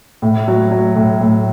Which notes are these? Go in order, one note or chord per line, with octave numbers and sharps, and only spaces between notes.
A2
F#3
F#3
A2
A2